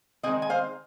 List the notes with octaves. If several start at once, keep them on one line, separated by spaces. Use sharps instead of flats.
D#3 G#3 C4 D#5 G#5
G#5
C5 F5